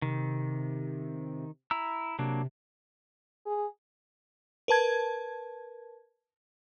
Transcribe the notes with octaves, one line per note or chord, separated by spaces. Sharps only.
C3 D#3
E4 A#5 E6
C3 F#3 A#3 D4
G#4
A#4 B4 A5 G#6